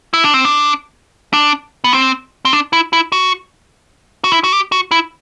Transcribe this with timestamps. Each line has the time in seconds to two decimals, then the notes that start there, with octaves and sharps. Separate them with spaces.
0.14 E4
0.24 D4
0.34 C4
0.45 D4
1.33 D4
1.84 B3
1.93 C4
2.45 C4
2.53 D4
2.73 E4
2.93 E4
3.12 F#4
4.24 F#4
4.32 E4
4.44 F#4
4.53 G4
4.72 F#4
4.91 E4